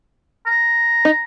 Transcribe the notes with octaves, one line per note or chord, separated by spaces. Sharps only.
A#5
D#4